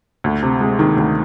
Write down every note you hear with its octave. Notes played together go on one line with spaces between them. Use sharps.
D2
C3
G#3
D#3
D2